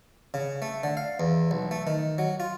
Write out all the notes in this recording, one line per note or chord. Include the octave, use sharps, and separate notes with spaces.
C#3
A3
D3
F5
E2
B1
A3
D#3
F#3
F4